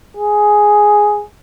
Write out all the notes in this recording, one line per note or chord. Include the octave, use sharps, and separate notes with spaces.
G#4